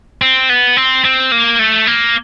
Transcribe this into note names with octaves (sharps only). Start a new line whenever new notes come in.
C4
B3
C4
C4
A#3
A3
A#3